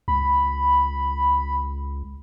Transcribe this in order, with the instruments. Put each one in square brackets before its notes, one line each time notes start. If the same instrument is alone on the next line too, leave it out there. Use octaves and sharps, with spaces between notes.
[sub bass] C#2 [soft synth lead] B5